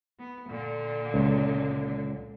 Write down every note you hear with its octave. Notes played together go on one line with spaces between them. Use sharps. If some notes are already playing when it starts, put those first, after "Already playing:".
B3
A#2 D3
C#2